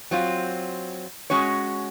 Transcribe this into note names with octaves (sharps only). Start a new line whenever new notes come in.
F#3 C4 F4
G#3 C#4 F#4 C#5